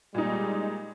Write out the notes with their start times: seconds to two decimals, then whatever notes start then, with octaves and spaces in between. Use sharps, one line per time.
0.15 A#2 G3 G#3 D#4